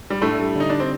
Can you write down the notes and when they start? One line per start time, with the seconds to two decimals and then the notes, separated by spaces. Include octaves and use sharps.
0.10 G3
0.21 A2 A3 D4
0.38 G3
0.55 D3 D#4
0.70 D4
0.80 C4